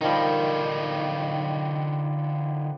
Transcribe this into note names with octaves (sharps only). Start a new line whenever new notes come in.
D3 D#3 F3 G3 D#4